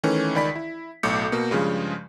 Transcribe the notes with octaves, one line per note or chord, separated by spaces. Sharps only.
D#3 E3 A3 C#4
C#2 D#3 D5 B5 B6
E4
B1 A2 A4 D6 G6 C#7
B2 A#3
G2 C#3 F3 G#3